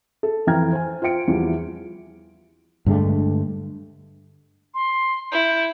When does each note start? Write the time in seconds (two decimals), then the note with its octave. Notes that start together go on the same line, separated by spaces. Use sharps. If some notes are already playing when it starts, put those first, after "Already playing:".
0.23 A4
0.47 F2 E3 G5 A#5 F6 G#6
0.73 C5 G#5
1.02 F4 C5 G5 C#7 D7
1.28 E2 E3 F3 G3
2.86 G2 D3 G#3 A3
4.74 C6
5.32 E4 G6